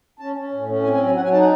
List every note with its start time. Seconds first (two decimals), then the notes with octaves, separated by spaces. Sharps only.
0.20 C#4 A5
0.36 C#4
0.52 A2
0.68 C#4
0.84 C4 G#5
0.94 G#5
0.99 F#3
1.06 G#5
1.16 F#3 F#5
1.24 G#5
1.32 D#4 A5
1.40 F#5